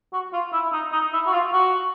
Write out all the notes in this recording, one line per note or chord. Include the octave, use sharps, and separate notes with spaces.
F#4
F4
E4
D#4
D#4
E4
F#4
F4
F#4